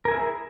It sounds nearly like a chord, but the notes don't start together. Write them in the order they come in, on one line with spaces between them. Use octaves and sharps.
A#4 G#5 E4 G#4